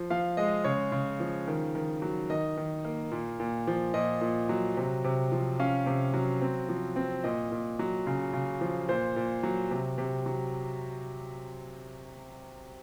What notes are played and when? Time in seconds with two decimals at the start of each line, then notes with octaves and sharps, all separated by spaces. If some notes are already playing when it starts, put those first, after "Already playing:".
Already playing: F3
0.10 F3 F5
0.37 G#3 D#5
0.65 C#3 C#5
0.92 C#3
1.20 F3
1.48 D#3
1.75 D#3
2.02 F#3
2.30 D#3 D#5
2.57 D#3
2.85 A#3
3.11 A#2
3.40 A#2
3.67 F3
3.94 A#2 D#5
4.21 A#2
4.49 F#3
4.77 C3
5.04 C3
5.32 F3
5.59 C#4 F5
5.86 C3
6.14 F#3
6.42 C4
6.69 F3
6.96 C4
7.24 A#2 D#5
7.52 A#2
7.79 F#3
8.07 C#3
8.33 C#3
8.61 F3
8.88 A#2 C5
9.16 A#2
9.43 F#3
9.71 C3
9.98 C3
10.26 F#3